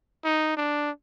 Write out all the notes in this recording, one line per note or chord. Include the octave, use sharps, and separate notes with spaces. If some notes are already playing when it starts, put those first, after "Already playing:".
D#4
D4